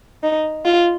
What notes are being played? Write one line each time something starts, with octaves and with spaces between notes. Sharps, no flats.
D#4
F4